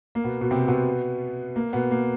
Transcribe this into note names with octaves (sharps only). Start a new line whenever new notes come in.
A#3
B2 B3
B2 B3
C3 C4
B2 B3
A#3
B2 B3
A#3